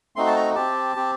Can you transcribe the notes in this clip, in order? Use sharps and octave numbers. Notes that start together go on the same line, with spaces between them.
A3 C4 D#4 F#4 C6
A5
A#5
C4 G4 A5
C4 G4